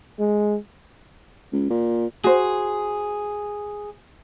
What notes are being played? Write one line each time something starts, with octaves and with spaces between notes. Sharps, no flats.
G#3
C#2
A#2
F#4 G#4 C5